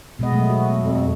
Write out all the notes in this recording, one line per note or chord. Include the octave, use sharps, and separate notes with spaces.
B2 G#3 B3 D#5
F#3 A3
F#4
F2